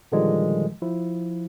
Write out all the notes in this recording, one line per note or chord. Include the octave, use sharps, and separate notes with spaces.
A#2 D3 D#3 F3 G3 G#3
F3 E4